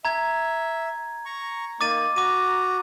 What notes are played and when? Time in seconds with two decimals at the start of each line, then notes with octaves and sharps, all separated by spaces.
0.05 E5 A#5 G#6
1.26 A#5 C#6
1.81 A#3 D#4 D6 A6 D#7
2.16 F#4 A#5 D6 D#7